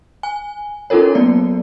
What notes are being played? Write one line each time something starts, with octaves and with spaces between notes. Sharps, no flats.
G#5
C#4 D#4 F4 A4 A#4 C#5
F#3 A#3 B3 D5